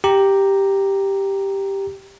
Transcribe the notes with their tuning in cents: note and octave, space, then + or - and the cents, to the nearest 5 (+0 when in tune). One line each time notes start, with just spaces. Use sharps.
G4 +0 A#5 +0